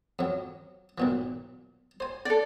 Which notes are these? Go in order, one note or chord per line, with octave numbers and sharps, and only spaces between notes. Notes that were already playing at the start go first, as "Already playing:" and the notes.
F2 F#3
B1 A#2 E3
C5 G#5
A4 D5